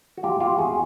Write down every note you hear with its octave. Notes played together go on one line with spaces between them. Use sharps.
F#4
E2 F4 G4
F4 G4
E2 F#4 G#4